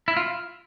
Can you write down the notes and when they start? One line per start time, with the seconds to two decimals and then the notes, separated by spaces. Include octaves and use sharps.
0.08 E4
0.17 F4